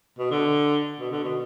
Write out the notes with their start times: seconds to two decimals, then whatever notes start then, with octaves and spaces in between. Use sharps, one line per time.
0.19 B2
0.31 D3
1.00 B2
1.11 D3
1.24 B2